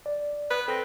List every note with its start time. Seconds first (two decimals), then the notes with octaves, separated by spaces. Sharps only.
0.06 D5
0.51 B4
0.68 C4 A4 A#6